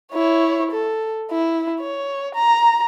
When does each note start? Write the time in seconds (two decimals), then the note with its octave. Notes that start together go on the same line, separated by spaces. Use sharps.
0.13 E4 C#5
0.71 A4
1.31 E4
1.80 C#5
2.35 A#5